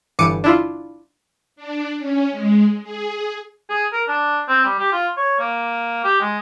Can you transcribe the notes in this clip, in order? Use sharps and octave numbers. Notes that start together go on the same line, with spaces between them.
G1 G2 E3 D6 C#7 D#7
D4 E4 F4
D4
C#4
G#3
G#4
G#4
A#4
D4
C4
G3
G4
F4
C#5
A#3
G4
G#3